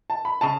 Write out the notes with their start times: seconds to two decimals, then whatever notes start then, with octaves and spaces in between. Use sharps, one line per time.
0.10 A5
0.25 B5
0.41 C#3 A5